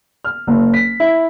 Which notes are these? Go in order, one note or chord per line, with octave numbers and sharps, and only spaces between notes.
F6
F#1
B6
E4